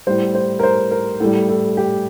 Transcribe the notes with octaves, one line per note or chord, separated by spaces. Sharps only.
A2 G3 C5
C5
A#4
C5
A#4
A2 G3 A4
A4
G4